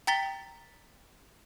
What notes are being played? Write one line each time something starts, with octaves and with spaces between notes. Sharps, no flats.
G5 A#5 A6 B6 G7